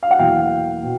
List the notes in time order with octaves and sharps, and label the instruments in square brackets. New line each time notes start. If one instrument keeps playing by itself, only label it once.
[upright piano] F5
F#5
E2 B2 F#3 A#3 F5 G5
B2